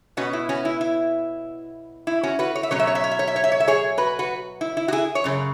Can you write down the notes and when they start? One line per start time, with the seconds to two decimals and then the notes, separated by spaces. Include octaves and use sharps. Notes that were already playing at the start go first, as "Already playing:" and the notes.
0.17 B2 B3 C#4 F#4
0.33 E4
0.49 C#4 F#4
0.65 E4
0.81 E4
2.07 E4
2.23 C#4 F#4
2.39 F#4 B4
2.55 C#5
2.63 E5
2.71 B2 F#3 C#4 C#5
2.79 E5
2.87 C#5
2.95 E5
3.04 C#5
3.11 E5
3.19 C#5
3.28 E5
3.36 C#5
3.44 E5
3.52 C#5
3.60 E5
3.68 G#4 C#5
3.98 F#4 B4
4.19 F#4 B4
4.61 E4
4.77 E4
4.88 F#4
4.93 E4 G#4
5.15 C#5
5.24 F#2 C#3